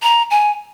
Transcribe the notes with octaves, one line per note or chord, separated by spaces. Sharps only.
A#5
G#5